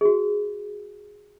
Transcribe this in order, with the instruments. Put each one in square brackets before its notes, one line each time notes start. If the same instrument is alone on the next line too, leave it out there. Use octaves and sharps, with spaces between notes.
[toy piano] F#4 G#4